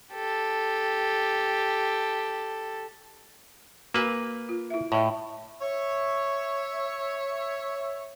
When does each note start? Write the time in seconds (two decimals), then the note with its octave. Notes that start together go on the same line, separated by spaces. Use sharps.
0.13 G4 A4
3.94 A#3 F#4 B4 G#5
4.49 F4
4.70 E4 E5
4.92 A2 C#5 D#5 E5
5.60 C#5 E5